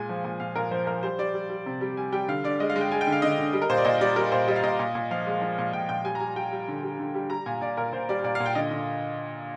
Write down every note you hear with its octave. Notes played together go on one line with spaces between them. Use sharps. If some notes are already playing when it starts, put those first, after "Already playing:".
Already playing: A#2 G#3 G#5
F3
A#2
A#2 F5
A#2 A#4
F3 C5
F3 A#4
G3 C5
G3 D5
G3
G3
C3
G3
G3 G#5
G3 G5
D3 F5
D3 D5
G#3 D#5
F5
G#3
G5
G#3 G#5
G5
D3
F5
D3 D#5
D3
G3
A#4
A#2 C5
D5
A#2 D#5
G3 D5
G3 A#4
A#2 C5
G3 D#5
F5
A#2 D#5
A#2
A#2
F3 F5
G#3
F3
A#2
A#2 G5
A#2 G5
G3 G#5
A#5
G3 G#5
G3 G5
G3
D3
G3
D3
G3
G3 A#5
A#2 G#5
A#2 D5
A#2 A#4
A#2 C5
G3 D5
A#2 D5
F5
A#2
G5
D3 D#5
D3